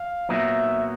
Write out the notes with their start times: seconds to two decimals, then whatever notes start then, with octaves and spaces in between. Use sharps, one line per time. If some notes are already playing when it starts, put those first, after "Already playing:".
Already playing: F5
0.29 A#2 F#3 B3 D#4 E5